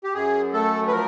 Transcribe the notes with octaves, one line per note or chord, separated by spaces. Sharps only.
G4
F#2 G#4
A3 A4
B4
F3 A#4